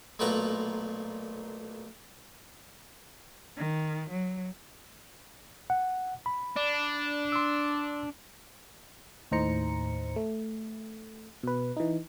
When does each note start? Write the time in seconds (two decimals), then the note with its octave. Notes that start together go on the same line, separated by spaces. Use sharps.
0.19 B1 A#2 A3 B4 F#5 A#5
3.56 D#3
4.10 F#3
5.70 F#5
6.26 B5
6.56 D4
7.32 C6 E6
9.31 D#2 A2 D#4 C5 A#5 C#7
10.16 A3
11.43 B2 B4
11.77 E3 D#4